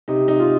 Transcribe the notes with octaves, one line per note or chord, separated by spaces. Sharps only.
C3 D#4
D#4
F4